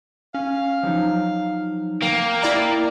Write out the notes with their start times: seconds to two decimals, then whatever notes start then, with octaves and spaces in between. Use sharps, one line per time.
0.34 C#4 F5
0.83 F3 F#3 D#4
2.02 A#3 G5
2.42 E4 D5 A#5